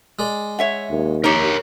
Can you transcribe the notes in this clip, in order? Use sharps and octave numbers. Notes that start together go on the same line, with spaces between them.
G#3 D5
C#5 E5 F#5
D#2
D#4 G4 A#4 C#5